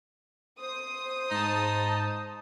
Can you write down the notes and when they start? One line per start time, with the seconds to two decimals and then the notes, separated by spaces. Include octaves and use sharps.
0.59 C5 D#6
1.31 G#2 D#4 A5